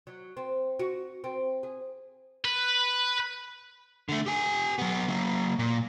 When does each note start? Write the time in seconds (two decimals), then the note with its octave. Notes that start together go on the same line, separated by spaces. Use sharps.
0.07 F#3
0.37 C4
0.79 F#4
1.24 C4
1.63 G#4
2.45 B4
4.09 D3 A3
4.26 G4 G#5
4.78 F#3 B3
5.08 F#3 A#3
5.59 A#2